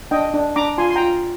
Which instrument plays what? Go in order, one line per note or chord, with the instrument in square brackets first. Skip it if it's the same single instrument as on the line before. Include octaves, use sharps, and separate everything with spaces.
[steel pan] D4 D#5 G5
D4
D4 A#5 D6
F4 G#5 C6
C6
F4 G5 A#5